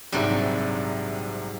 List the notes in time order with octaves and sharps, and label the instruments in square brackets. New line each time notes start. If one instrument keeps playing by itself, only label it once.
[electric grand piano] A#1 C3 E5 [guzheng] G#2 F#3 G3